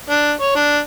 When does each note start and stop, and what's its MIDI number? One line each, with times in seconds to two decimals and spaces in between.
0.10 0.32 62
0.41 0.53 73
0.56 0.78 62